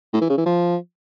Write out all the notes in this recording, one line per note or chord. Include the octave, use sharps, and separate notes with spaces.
A2
E3
C#3
E3
F3